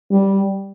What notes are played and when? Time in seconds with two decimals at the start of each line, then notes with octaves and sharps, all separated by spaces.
0.12 G3